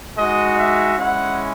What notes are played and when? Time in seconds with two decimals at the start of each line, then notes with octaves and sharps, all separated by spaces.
0.17 G#3 D#4 F#4 D#5
0.58 E5
0.98 G#3 C#4 E4 F#5